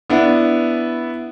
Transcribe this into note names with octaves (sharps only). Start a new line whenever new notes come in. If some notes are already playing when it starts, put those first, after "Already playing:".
B3 D4 E4